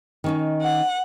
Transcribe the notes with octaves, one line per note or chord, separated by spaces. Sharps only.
D#3 C#4 D#4
F#5